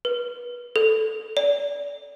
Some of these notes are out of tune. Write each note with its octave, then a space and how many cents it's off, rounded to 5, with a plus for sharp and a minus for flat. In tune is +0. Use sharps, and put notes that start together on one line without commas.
B4 -25
A4 -5
D5 -30